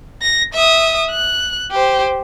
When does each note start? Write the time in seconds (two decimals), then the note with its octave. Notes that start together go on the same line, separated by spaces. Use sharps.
0.22 A#6
0.54 E5 D#6
1.10 F#6
1.71 G4 C5